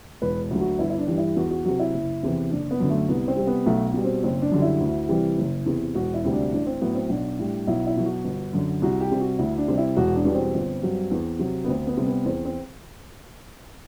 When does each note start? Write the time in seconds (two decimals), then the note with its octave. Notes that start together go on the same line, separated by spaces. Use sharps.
0.22 E1 B4
0.51 D2 D3 F#3
0.61 F#4
0.79 G1 E4
0.90 E4
0.98 D4
1.07 G2 E3 G3
1.18 E4
1.36 E2 F#4
1.51 F#4
1.65 C3 F#3 F#4
1.79 E4
1.93 F#1
2.23 E2 C3 E3
2.51 F#1 D4
2.71 B3
2.80 F#2 D3
2.90 A3
3.08 C2 B3
3.28 C4
3.37 C3 G3
3.47 B3
3.66 B1 A3
3.94 B2 G3
4.04 C4
4.23 F#1 C4
4.42 D4
4.51 F#2 D3 G3
4.62 E4
4.81 D2
5.09 C3 E3 G3
5.38 F#1
5.66 E2 C3
5.95 E1 F#4
6.14 E4
6.24 D2 C3 G3
6.33 D4
6.52 A1 D4
6.67 C4
6.81 A2 F#3 B3
6.95 C4
7.09 B1 D4
7.39 A2 G3
7.67 B1 E4
7.87 E4
7.96 B2 F#3
8.05 F#4
8.24 G1
8.53 F#2 D3
8.82 C2 F#4
9.00 G4
9.11 C3 G3
9.21 F#4
9.39 D2 E4
9.58 D4
9.68 C3 G3
9.78 E4
9.97 E1 F#4
10.16 D4
10.25 E2 B2 G3
10.35 C4
10.54 G1
10.83 G2 F#3
11.11 E2
11.39 C3 F#3
11.64 B3
11.68 D2 C4
11.87 B3
11.97 C3 G3
12.07 B3
12.25 E2 C4
12.45 C4